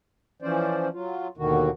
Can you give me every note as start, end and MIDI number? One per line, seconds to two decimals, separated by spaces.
0.42 0.88 52
0.42 0.88 53
0.42 0.88 61
0.42 0.88 72
0.42 0.88 74
0.93 1.28 54
0.93 1.28 65
1.37 1.70 39
1.37 1.70 47
1.37 1.70 50
1.37 1.70 51
1.37 1.70 66